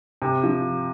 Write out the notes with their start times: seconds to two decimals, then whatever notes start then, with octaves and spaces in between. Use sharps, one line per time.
0.22 C3
0.44 F3